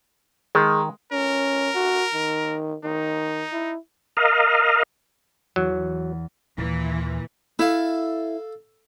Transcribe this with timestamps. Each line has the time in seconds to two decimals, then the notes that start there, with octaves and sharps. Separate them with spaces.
0.55 D#3 G#3
1.12 C#4 A#4
1.75 F#4
2.14 D#3
2.84 D#3 D#4
3.53 E4
4.17 A#4 D#5 F5
5.56 E2 F#3
6.58 D#2 A#2 E3
7.59 E4 A4 F5